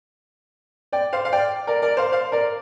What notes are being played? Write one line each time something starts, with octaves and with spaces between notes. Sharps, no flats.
D5 G5
C5 F5
F5
D5 G5
A#4 D5
A#4 D5
C5 F5
C5 F5
A#4 D5